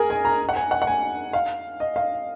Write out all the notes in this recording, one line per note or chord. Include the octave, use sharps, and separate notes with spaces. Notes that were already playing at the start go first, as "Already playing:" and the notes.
Already playing: G#4 A#4
G#5
A#5
F#5
G#5
F#5
F#5
G#5
F5
D#5
F5